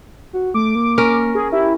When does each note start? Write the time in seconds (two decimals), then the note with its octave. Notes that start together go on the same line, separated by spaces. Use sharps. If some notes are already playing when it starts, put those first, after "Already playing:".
0.33 F#4
0.54 A3 D6
0.75 A#3
0.98 C#4 A#4
1.35 G#4
1.52 E4 G4